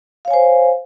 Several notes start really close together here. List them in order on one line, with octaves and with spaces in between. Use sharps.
F5 C#5 G#5 C5